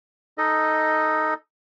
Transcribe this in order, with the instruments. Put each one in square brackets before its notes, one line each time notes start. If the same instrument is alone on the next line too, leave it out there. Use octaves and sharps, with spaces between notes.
[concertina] D#4 A4 D#5